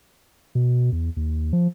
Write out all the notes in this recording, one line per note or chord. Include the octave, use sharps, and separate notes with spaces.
B2
E2
D#2
F3